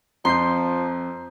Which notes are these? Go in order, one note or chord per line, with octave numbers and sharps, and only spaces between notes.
F2 F3 A#5 C6 G6 C7